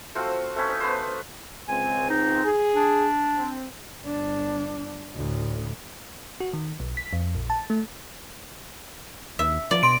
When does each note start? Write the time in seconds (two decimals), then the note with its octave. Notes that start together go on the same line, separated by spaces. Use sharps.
0.15 A3 C4 F4 F#4
0.56 A3 C4 C#4 B4
0.68 D#4
0.80 B3 B4 C5
1.68 C#2 C4 G#5
2.09 D#4
2.44 G#4
2.75 D4
3.36 C4
4.01 G1 D4
5.15 D2 A2
6.40 F#4
6.53 D#3
6.80 B1
6.97 B6
7.13 F2
7.35 A#1
7.50 A5
7.70 A3
9.39 D#2 E5
9.71 F3 D5
9.83 B2 C6 D7